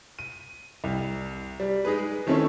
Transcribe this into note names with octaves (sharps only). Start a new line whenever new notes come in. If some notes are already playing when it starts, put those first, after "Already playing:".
D#7
C2
G3
G#3 D#4 G#4 B4
D#3 A3 C4 C#4 E4 C#5